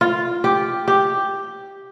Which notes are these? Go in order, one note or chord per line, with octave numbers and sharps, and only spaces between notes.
F4
G4
G4